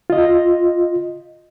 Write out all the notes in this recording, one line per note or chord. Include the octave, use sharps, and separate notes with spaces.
F4 D#5